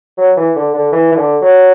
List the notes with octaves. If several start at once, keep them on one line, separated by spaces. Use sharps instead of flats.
F#3
E3
D3
D3
E3
E3
D3
F#3